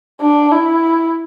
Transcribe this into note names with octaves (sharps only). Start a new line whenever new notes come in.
D4
E4